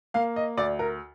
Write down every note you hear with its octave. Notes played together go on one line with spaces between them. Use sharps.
A#3 F5
D#5
D2 D5
A#4